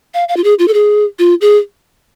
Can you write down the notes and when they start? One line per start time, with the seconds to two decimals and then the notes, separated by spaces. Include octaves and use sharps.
0.14 F5
0.29 F5
0.37 F4
0.44 G#4
0.59 F4
0.68 A4
0.74 G#4
1.19 F4
1.41 G#4